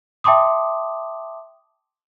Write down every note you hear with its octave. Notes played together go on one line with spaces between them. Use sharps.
E5 G5 A5 C6 D6 D#6